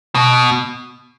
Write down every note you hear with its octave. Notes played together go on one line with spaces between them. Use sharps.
B2